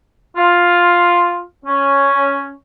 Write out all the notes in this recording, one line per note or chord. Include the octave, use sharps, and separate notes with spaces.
F4
C#4